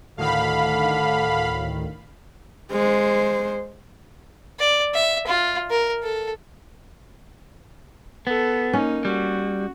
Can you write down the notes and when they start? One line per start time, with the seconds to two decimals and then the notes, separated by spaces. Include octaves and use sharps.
0.17 D2 A2 D3 D#3 F5 B5
2.73 G#3 C5
4.59 D5
4.94 E5
5.27 F4
5.70 A#4
6.03 A4
8.27 B3 A4
8.73 A#3 C#4 D#4
9.05 G3 F#4